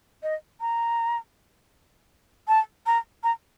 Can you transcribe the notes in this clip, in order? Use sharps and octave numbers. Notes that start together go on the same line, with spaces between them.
D#5
A#5
A5
A#5
A#5